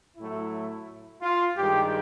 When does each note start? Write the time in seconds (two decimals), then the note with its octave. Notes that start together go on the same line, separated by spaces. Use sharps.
0.17 A2 F#3 A3 E4
1.22 F4
1.56 G2 D#3 G#3 G4